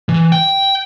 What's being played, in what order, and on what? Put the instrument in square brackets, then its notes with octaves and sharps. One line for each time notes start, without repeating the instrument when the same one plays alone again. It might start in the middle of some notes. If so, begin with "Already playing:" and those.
[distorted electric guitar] E3
G5